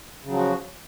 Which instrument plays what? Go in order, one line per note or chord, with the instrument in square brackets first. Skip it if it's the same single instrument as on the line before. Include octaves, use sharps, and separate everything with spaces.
[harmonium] C#3
F#3
F3
F#4